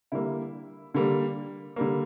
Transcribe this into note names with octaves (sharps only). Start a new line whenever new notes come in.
D3 G3 A#3 E4
D3 G3 A#3
D3 G3 A#3